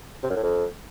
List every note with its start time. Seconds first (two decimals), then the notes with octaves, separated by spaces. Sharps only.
0.23 C3
0.30 F#2
0.36 A2
0.43 F2